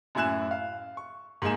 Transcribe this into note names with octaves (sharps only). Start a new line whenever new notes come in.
F#2 A2 E4 G#5 F#6 E7
F5
C#6
G#2 A#3 D#4 G#5 E7